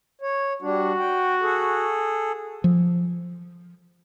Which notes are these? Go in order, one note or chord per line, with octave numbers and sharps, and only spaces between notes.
C#5
G3 D4 F#4
G5
G#4 A4
F3